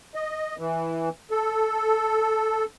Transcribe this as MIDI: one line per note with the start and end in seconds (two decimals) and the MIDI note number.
0.15 0.55 75
0.59 1.09 52
1.31 2.65 69